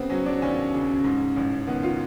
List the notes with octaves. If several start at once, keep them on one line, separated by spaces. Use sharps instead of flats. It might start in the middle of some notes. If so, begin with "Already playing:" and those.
Already playing: C#3 B3 C4
F#3 C#4
D4
D#2 C#4
C#3
G#2
A1
D#3 B3
F4